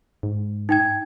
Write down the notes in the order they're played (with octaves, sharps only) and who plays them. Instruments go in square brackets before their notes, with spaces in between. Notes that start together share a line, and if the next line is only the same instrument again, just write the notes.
[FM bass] G#2
[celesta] D#4 G5 G#6